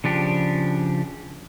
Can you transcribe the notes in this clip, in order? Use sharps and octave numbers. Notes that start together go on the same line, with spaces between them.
C#3 F3 D4 G4